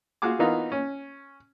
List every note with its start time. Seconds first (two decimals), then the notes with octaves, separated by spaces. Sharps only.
0.22 F4 F#4 G#4 G#5 D6
0.39 E3 A#3 B3 D#4 F4
0.72 C#4